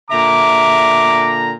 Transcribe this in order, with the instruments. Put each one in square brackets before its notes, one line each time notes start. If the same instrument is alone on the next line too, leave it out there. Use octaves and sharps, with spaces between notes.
[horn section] A#2 D3 A#5 [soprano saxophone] E5 [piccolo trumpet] D6